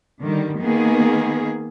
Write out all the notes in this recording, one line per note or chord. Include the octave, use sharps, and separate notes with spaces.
D3 D#3 G3
D#3 A#3 B3 G#4